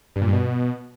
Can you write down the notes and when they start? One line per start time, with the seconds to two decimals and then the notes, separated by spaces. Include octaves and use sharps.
0.16 G2
0.21 A#2
0.27 G2
0.33 B2